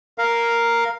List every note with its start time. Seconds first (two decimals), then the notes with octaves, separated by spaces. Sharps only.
0.18 A#4 F5